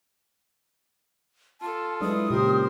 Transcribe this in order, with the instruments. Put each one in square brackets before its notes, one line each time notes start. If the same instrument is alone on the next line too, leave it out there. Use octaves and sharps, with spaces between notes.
[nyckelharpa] F4 A4 [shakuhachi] A5
[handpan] F#3 G#3 D4 [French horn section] E4 B4 [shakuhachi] D#6
[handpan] A#2 C#3 [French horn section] G4 [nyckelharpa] A#4 C5